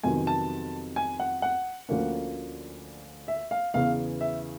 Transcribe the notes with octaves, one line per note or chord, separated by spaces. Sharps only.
F2 C3 D#3 F#3 B3 G#5
A5
G#5
F#5
F#5
D2 D3 F3 A#3 C#4
E5
F5
E2 C#3 E3 F5
E5